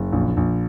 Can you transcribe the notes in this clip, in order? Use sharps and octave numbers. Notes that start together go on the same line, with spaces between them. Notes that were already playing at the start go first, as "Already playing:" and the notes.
Already playing: F#1
A#1
A#1